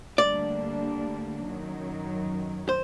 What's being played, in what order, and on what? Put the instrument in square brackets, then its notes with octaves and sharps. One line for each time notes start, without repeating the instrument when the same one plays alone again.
[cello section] D2 D3 G3 A#3 D4 [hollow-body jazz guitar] D5
[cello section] F#2 D#3 F#3
[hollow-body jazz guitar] C5